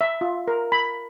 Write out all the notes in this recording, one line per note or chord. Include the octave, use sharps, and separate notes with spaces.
E5
F4
A#4
B5